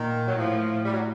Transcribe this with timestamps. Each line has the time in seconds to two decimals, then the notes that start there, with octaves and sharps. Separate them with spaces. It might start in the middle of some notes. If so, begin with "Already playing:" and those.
Already playing: A#2 D#3
0.27 F#3
0.37 A2 F3
0.84 G3
0.92 F#3